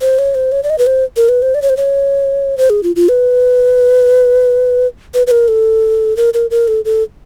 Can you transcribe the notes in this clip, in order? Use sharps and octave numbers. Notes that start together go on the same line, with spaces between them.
C5
C#5
C5
C#5
D5
D#5
B4
C5
A#4
B4
C5
D5
C#5
C5
C#5
C5
G#4
F4
F4
B4
B4
B4
A#4
A4
A#4
A#4
A#4
A4
A4